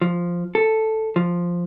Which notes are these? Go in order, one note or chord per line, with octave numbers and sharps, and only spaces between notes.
F3
A4
F3